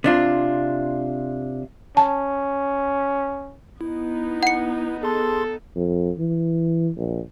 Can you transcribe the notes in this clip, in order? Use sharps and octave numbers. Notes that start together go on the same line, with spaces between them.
C3 D4 F4
C#4 A5
B3 D#4 E4
F#5 C#7
G#4 A4 C6
F2
E3
A#1